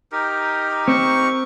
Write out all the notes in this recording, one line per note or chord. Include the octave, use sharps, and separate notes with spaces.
D#4 G4 A#4
C4 C#6